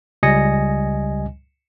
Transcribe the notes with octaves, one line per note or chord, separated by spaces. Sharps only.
C#2 G3 D#5 G#5 A#6 C#7